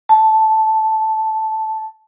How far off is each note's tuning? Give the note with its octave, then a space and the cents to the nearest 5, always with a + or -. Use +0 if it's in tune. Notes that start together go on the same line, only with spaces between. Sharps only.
A5 -5